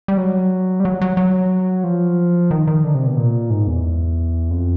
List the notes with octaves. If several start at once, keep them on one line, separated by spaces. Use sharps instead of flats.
G3
F#3
G3
F#3
F#3
F#3
F3
D#3
D#3
D3
C3
B2
A#2
G#2
E2
F2